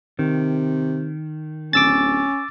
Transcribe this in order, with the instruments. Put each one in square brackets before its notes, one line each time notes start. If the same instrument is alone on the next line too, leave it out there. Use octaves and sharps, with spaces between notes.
[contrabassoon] C3 [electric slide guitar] D#3
[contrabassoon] D1 [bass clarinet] C#4 [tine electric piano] D6 E6 A6